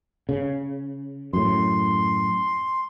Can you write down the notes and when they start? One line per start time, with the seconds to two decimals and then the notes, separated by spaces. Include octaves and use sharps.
0.29 C#3
1.33 F#2 A2 C6